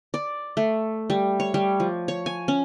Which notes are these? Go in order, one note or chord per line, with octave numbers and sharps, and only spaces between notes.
D5
A3
G3
C#5
G3
F3
C#5
G#5
C#4